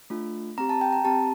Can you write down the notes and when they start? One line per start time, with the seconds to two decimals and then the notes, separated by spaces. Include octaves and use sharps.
0.10 A3 D4 F4
0.58 C4 G4 A#5
0.69 A5
0.81 G5
0.92 A#5
1.04 C4 G4 A5